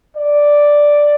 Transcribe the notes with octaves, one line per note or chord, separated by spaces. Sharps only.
D5